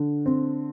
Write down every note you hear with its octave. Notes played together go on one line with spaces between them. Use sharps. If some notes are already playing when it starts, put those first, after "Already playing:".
Already playing: D3
C4